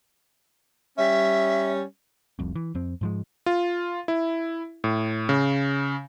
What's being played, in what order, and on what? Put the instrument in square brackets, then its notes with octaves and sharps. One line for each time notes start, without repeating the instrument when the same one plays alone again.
[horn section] G3 C#4 [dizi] E5
[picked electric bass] F1 C2 F2
E3
F2 C4
G#2 F3 G#3
[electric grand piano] F4
E4
A2
C#3